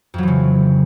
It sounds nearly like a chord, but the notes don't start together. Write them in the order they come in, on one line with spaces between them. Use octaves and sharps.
F2 F#3 E3 C#3